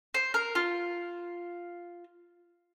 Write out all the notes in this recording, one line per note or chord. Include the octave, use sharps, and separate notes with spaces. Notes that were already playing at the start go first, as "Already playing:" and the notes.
C5
A#4
F4